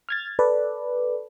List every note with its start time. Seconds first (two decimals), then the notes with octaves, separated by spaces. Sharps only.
0.09 F6 G#6 A6
0.39 A4 B4 D5